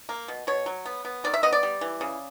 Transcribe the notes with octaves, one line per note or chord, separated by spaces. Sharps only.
A#3
B2
B2 C#5
F#3
B3
B3
D#3 D5
E5
B3 D#5
D5
G3
E3
C#3